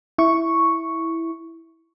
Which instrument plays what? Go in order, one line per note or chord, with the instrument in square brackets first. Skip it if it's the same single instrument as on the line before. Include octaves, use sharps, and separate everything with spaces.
[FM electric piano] E4 C#6